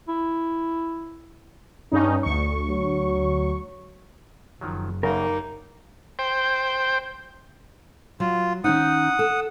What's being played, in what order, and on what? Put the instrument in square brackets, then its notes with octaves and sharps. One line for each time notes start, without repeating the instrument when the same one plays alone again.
[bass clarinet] E4
[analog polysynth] G2 C#4 D#4
D2 C#6
[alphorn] F#3
[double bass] F#1 [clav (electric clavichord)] D#3 F3 F#3
[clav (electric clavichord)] F#2 C#3 [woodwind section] G3 A#3 D#4 [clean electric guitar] A#4
[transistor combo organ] C5 G5
[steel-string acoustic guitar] F#3 [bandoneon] F4
[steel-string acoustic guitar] D#3 C#4 D#4 [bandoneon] F#5 D#6
[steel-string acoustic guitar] A4